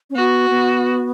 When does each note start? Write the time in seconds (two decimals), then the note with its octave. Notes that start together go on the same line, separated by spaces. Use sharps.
0.10 C#4
0.15 B3 F#4
0.50 B3